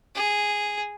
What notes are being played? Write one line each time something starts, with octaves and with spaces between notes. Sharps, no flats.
G#4